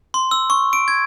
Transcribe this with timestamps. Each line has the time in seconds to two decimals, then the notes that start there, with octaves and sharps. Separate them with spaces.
0.14 C6
0.31 E6
0.50 C#6
0.73 D7
0.88 G#6